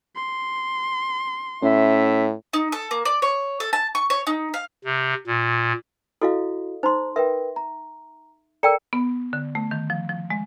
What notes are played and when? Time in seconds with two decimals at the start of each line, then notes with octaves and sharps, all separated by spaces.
0.16 C6
1.63 A2 C#4 E5
2.53 D#4
2.72 A4
2.91 A#3
3.05 D5
3.22 C#5
3.60 A4
3.73 A5
3.95 C#6
4.10 C#5
4.27 D#4
4.54 F5
4.84 C3
5.27 A#2
6.22 E4 F#4 A4 D#5 F5
6.83 D#4 C5 A#5 C6
7.16 A#4 B4 E5 G5
7.56 A#5
8.63 A4 A#4 D5 G5 A#5 C#7
8.93 B3
9.33 D3
9.55 A3
9.71 D#3
9.90 F3
10.09 F3
10.30 G#3